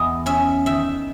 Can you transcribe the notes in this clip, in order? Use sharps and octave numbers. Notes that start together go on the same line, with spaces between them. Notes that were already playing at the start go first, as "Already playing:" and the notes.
Already playing: E2 D#5
C#4 E5
D#3 E5